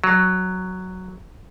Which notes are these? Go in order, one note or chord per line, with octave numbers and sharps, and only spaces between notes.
F#3